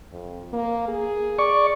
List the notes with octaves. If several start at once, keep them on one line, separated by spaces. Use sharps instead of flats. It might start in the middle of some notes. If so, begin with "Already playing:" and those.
F2
A#3
G#4
D5 C#6